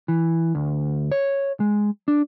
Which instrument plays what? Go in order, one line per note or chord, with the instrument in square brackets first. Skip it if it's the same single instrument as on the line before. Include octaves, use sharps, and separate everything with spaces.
[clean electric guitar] E3
D2
C#5
G#3
D4